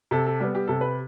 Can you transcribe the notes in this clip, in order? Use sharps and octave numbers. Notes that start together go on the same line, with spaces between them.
C3 A4
A4
G3 B3 G4
G4
C3 A4
B4